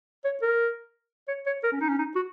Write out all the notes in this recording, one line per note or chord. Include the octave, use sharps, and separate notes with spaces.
C#5
A#4
C#5
C#5
A#4
C#4
D#4
C#4
D#4
F#4